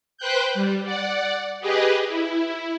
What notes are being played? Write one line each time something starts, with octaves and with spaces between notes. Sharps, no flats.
B4 C5 G5 F#6 G6
G3
D5 F#5
G4 G#4 B4 D#5
E4